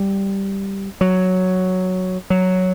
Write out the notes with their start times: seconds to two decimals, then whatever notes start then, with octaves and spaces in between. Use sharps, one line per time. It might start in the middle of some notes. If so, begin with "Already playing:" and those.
Already playing: G3
1.01 F#3
2.30 F#3